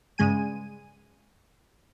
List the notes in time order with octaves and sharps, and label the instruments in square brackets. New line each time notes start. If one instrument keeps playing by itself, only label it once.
[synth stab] G2 C#3 G#3 G#5 D#7